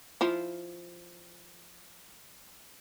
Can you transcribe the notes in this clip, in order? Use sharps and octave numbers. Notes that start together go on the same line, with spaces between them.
F3 E4 F4